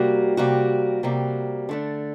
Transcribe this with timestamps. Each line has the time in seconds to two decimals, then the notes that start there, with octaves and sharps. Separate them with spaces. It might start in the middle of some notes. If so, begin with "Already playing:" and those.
Already playing: C3 G3 A#3 F#4
0.37 C3 G3 A#3 F#4
1.03 C3 G3 A#3 F#4
1.69 D3 A3 D4